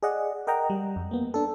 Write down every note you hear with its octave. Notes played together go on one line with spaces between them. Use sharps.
G#4 D5 D#5 F#5
A#4 D#5 F#5 G5 A#5
G3
F2
A#3 B3
D4 A4